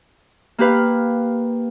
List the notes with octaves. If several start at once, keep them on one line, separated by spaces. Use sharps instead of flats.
A#3 G4 B4 F5